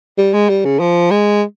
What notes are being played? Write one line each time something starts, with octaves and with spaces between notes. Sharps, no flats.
G3
G#3
G3
C#3
F3
G#3